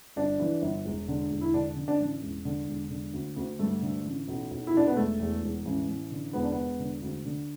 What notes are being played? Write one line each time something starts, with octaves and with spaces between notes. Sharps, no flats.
G1 D4
E3
G1
E1
D3
E1
E4
D3 D4
D3
D4
A1
E1
D3
E1
D3
D2
D2
G2 A3
D3
A1
B1
B1
E4
B1 D4
B3
E1 A3
E2
E1
A1
A1
D3
E1 B3
D4
E1 B3
D3
D2
D3